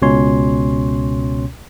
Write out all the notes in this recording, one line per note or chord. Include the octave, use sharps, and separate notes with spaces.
C#2 B2 C#4 C#5 C6